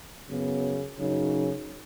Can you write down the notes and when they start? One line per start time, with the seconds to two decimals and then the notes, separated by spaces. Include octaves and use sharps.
0.28 F#2 C#3 F#3 B3
0.98 F#2 C#3 F#3 D#4